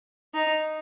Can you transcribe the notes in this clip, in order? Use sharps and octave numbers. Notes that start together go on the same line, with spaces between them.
D#4